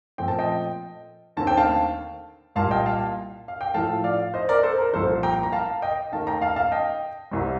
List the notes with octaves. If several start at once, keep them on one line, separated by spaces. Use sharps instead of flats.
A#2 F3 A3 C4 G5
A5
D#5 G5
D#2 D3 A3 C4 A5
G5
F5 A5
C2 A#2 G3 A#3 F5 A5
D#5 G5
F5 A5
F5
G5
A2 F3 A3 F5 A5
D5 F5
C5 D#5
A#4 D5
A4 C5
A#4
C2 A#2 F3 A#3 A4 C5
G5 A#5
A#5
F5 A5
D#5 G5
D#2 D#3 A3 F5 A5
G5 A#5
F5 A5
F5 A5
D#5 G5
C2 C3 G3 C4